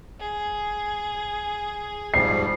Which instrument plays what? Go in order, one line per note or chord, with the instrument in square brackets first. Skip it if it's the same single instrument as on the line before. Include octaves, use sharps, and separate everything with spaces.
[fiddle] G#4
[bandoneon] G#2 F3 G3 [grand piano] C7